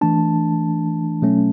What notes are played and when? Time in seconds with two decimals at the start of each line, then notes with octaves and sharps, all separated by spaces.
0.01 E3 A3 D4 A5
1.22 B2 F#3 A3 C#4